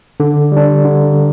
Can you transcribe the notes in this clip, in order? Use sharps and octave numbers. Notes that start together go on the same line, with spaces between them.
D3
G3 D4
D3